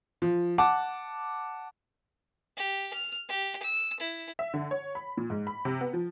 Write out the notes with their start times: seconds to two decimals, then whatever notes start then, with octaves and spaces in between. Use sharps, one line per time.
0.22 F3
0.58 F#5 A5 D6
2.57 G4
2.93 F6
3.28 G4
3.62 E6
4.00 E4
4.39 E5
4.54 D3
4.71 C#5
4.95 B5
5.17 A#2
5.30 G#2
5.47 B5
5.65 C3
5.81 B3
5.93 F3